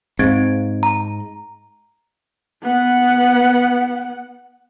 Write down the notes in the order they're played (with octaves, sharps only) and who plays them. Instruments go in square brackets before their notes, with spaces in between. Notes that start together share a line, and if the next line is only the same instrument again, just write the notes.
[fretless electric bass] G#2 [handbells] C4 G#6 D7
[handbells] A#5
[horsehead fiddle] B3 F#5